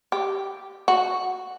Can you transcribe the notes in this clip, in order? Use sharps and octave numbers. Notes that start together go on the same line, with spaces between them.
G4
F#4